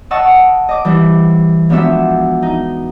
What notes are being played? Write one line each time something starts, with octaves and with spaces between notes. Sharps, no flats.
D#5 F#5 A5 C#6 E6
D#5 D6
E3 G3 E4
G#2 F3 B3 D4 F#4 E5
D#4